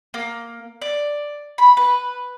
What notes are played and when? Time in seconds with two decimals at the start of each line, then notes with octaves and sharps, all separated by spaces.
0.14 A#3
0.82 D5
1.58 B5
1.77 B4